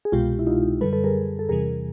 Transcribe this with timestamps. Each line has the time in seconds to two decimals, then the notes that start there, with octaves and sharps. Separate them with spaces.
0.05 G#4
0.12 C2 B2 G#3 F4 G4
0.39 E4
0.47 D#4 F4
0.81 F#2 D3 G3 A4 B4
0.93 A4 B4
1.04 G#4 A#4
1.39 A4
1.49 E2 C3 E3 G3 G#4 A#4